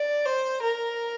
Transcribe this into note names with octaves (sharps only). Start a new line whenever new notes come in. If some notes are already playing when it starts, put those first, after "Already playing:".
Already playing: D5
C5
A#4